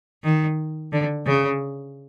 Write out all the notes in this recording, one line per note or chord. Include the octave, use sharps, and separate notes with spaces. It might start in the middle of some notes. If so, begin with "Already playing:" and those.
D#3
D3
C#3